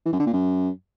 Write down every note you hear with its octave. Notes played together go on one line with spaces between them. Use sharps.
E3
F#2
D3
A#2
F#2